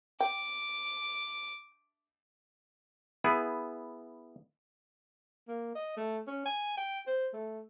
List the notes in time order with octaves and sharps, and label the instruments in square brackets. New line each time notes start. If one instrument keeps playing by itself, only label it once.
[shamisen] G5 [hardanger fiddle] D6
[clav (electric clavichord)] B3 E4 G#4
[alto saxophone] A#3
D#5
A3
C#4
G#5
G5
C5
A3